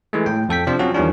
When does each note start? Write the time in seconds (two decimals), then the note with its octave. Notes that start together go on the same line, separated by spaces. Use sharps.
0.13 E3 G#3 A3
0.26 A2 G5
0.49 F2 A4 G5 B6
0.67 C3 F3 D4 C5
0.79 F3 F#3 C4 C#4 F#4
0.94 E2 D#3 F3 G3 C#4 D4